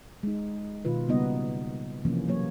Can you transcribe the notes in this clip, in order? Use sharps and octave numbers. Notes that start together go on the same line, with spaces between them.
G#3 D#4
B2 D#3 F4 B4
C#3 G3 A#3 B3 D#4 D#5
C3 E3 F3 A#3 C#4
F#3 A#3 C#5